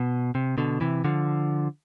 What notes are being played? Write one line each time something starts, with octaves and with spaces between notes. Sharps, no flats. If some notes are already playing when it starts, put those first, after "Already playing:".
Already playing: B2
C3
B2 D3
C3 E3
D3 F3